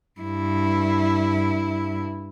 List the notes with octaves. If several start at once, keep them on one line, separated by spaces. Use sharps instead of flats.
G2 E4